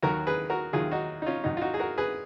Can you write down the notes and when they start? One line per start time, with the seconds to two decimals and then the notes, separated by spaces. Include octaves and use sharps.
0.02 D#2 D#3 F#3 F#4 A#4
0.27 G#4 B4
0.50 F#4 A#4
0.73 D#2 D#3 F#3 F4 G#4
0.91 D#4 F#4
1.22 D#4
1.27 C#4 F4
1.44 G#2 D#3 F#3 D#4
1.57 F4
1.61 D#4 F#4
1.74 G#4
1.79 F#4 A#4
1.98 G#4 B4